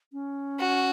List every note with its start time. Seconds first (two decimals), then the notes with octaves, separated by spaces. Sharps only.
0.13 C#4
0.59 F#4